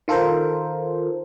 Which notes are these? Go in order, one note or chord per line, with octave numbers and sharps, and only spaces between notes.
D#3 F4 A4 A#4 C5